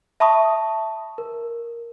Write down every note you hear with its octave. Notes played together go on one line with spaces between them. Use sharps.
E5 A5 B5 C#6 D#6
A#4